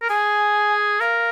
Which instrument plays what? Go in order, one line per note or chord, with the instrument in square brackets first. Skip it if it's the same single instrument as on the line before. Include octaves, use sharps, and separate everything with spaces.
[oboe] A#4
[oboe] G#4 [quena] G#5
[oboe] A#4 [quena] F5